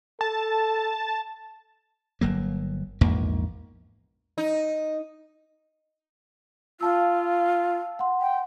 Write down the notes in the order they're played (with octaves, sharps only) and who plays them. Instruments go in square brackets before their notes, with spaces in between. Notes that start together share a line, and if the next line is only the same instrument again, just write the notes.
[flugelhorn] A4 [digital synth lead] A5
[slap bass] G1 F#3 A#3
A#1 E2 G#2 A#3
[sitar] D#4
[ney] F4 [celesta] F5 A5 E6
[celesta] F#5 C6
[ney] G5